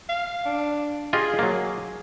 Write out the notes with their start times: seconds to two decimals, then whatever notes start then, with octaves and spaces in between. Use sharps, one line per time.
0.09 F5
0.45 D4
1.13 F4 G4 G#4 D#5
1.39 F#3 A#3